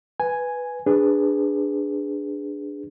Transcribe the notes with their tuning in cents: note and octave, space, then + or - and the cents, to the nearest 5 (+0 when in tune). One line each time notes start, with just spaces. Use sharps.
B4 +0 G#5 +0
D4 +0 G#4 -15 B4 +0